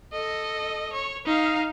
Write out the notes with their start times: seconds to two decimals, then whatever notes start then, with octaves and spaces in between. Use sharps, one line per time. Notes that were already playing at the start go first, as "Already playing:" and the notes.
0.13 A4 D#5
0.93 C#5
1.25 D#4 F5